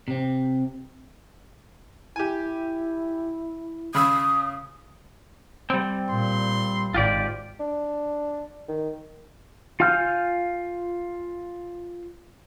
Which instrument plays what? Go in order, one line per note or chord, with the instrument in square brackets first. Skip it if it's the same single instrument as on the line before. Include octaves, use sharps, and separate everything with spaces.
[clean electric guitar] C3 C4
[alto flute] E4 [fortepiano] G4 G#5
[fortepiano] C#3 B5 E6 [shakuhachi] D#6
[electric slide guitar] G3 C4
[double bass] A#2 [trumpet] C6
[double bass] G#1 [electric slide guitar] F4 G4 D5
[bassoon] D4
D#3
[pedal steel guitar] F4 F5 G#5 F6 G6